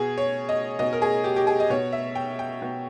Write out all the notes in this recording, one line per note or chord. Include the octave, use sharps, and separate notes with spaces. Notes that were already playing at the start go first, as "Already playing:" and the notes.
Already playing: B2 G#4
C#5
D#5
B2 D#5
A#4
G#4
G4
G4
G#4
D#5
B2 C#5
E5
G5
G5
B2